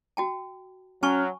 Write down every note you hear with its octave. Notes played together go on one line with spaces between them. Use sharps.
F#4 G5 A5
F#3 C#4 G#5 A5 C#6 F6